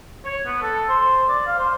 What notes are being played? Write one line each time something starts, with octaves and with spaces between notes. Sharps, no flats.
C#5
B3
A4
C5
D5
F5
C5